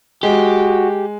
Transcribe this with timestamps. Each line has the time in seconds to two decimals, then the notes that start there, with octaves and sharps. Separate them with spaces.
0.23 G#3 F#4 G4